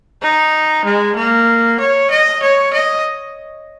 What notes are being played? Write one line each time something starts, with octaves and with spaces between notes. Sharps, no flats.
D#4
G#3
A#3
C#5
D#5
C#5
D#5